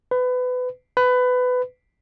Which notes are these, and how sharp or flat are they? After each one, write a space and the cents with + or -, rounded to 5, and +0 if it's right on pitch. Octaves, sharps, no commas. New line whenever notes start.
B4 +25
B4 +20